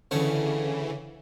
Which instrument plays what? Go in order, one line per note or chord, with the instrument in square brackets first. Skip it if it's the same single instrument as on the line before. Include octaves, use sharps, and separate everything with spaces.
[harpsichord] D2 A3 C#5 [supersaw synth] C#3 E3